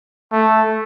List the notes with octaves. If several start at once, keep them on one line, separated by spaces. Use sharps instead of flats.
A3